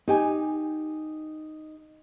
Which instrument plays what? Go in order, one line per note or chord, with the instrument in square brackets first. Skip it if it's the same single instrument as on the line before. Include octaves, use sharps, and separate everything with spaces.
[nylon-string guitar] D#4 G4 G#5